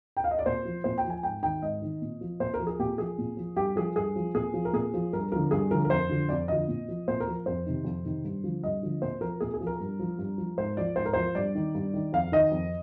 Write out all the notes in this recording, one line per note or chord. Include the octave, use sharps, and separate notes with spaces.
G5
F5
D#5
D5
A#2 C5
F3
A#2 C5
G5
F3
G#5
G#2 G5
D#3 G5
G#2 D#5
D#3
A#2
F3
A#2 C5
A#4
F3
G#4
A#2 G4
F3 G#4
A#2
F3
G2 G4
F3 G#4
G2 G#4
F3
A#2 G#4
F3
A#4
A#2 G#4
F3
G2 A#4
D3 F3 A#4
G2 G#4
D3 F3 A#4
A#4
F2 C5
D3 F3
F2 D5
D3 F3 D#5
A#2
F3
A#2 C5
A#4
F3
F2 C5
C3 D#3
F2
C3 D#3
G2
D3 F3
G2 D#5
D3 F3
A#2 C5
F3 A#4
A#2 G#4
G#4
F3
A#4
G2
F3
G2
F3
G#2 C5
F3 D5
G#2 C5
A#4
F3 C5
G2 D5
D#3
G2
D#3
F2 F5
D#3 D#5
F2